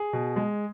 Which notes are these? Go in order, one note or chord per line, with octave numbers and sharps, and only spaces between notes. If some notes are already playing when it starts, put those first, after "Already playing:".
Already playing: G#4
B2
G#3